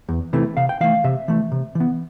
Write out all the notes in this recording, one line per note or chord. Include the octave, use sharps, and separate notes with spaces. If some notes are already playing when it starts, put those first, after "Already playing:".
E2
C3 E3 A3
C3 F5
G5
E3 A3 F5
C3 E5
E3 A3
C3
E3
B3